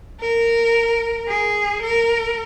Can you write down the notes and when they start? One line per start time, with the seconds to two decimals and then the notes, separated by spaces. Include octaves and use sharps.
0.21 A#4
1.28 G#4
1.82 A#4